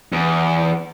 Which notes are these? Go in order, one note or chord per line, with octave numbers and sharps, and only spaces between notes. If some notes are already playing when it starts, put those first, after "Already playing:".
E2